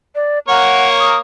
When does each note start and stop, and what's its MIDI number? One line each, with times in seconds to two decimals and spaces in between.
0.15 0.39 74
0.48 1.18 58
0.48 1.18 70
0.48 1.18 73
0.48 0.88 78
1.00 1.19 87